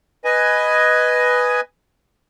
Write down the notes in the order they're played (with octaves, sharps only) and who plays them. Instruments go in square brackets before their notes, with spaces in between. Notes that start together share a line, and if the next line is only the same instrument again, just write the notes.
[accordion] B4 D#5 G#5